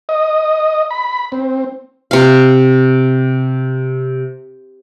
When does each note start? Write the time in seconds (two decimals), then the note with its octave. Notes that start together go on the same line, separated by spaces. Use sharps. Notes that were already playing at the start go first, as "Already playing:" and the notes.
0.09 D#5
0.91 B5
1.32 C4
2.11 C3 F5